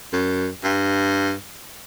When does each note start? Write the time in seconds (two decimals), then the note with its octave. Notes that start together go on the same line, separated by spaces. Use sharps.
0.13 F#2
0.64 G2